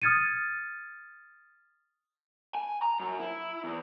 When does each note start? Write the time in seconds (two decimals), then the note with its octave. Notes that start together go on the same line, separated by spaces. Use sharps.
0.02 D#6 F6 G#6 A6 C#7 D#7
2.55 G#5
2.82 A#5
3.00 F#2
3.19 E4
3.64 E2